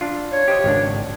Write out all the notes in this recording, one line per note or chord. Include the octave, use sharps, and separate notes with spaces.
D4 F4
C#5
G4 C5 D#5
G#1 C#2 D4